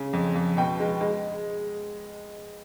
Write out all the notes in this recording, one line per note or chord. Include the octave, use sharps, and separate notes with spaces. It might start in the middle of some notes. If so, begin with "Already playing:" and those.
Already playing: C#3
F2
F2
B2 G5
G#3
G#3